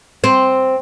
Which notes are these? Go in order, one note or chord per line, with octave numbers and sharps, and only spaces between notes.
C4